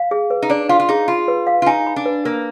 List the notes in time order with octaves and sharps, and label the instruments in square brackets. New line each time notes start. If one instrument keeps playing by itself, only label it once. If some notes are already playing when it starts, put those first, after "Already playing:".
Already playing: [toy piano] F5
G#4
B4
[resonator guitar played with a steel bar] D#4
[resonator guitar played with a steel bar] D4 [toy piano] D5
[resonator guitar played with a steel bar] F4 [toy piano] F5
[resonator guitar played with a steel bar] F4
[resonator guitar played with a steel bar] D#4 [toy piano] G#4
[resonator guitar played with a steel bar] F4 [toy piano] B5
[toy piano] B4
F5
[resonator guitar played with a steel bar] F4
[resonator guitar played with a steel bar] D#4 [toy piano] G#5
[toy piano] B5
[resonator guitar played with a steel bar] D4
[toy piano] B4
[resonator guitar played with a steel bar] A#3 [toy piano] A#4